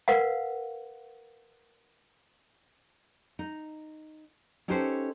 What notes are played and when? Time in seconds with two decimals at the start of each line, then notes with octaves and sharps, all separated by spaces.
0.08 A#4 B4 F5 F#5
3.39 D#4
4.68 C#4 D#4 G4 A4 B4 C5